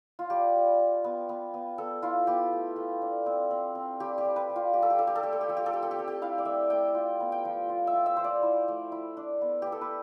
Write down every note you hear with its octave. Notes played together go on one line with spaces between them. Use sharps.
F4
G3 G4
G3
G3
B3
B3
B3
B3 A4
E4 F4
B3 G4
A3
A3
D4
C4
C4
C4
G3 G4
G4
G3
B4
G3
F4
F3 G4
A4
G4
D4 A4
G4
A4
A3 G4
A4
G4
F3 A4
G4
A4
C4 G4
A4
G4
C4 A4
G4
E4 F5
D5
A3 E5
A3 G5
F4
B3
G5
F3
F4
E5
F4
E5
F3 C5
D5
E4
A3
E4
D4
B3
B3 G4
A4
B4